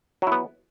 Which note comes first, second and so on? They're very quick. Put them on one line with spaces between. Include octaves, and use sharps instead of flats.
F#3 E4 B3